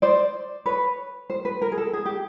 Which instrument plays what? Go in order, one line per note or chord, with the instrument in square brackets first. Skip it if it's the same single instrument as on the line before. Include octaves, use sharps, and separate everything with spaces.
[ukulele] C5 D5
B4 C#5
C5
B4
A#4
G#4
A4
G#4
G4